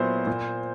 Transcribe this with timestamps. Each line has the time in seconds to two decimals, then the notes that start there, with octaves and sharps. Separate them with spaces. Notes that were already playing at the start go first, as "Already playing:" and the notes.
Already playing: A#2 F#3 B3 E4 C5
0.27 A#2